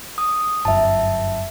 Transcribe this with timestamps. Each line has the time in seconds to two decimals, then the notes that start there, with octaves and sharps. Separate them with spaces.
0.18 D#6
0.65 G1 F#2 E5 A5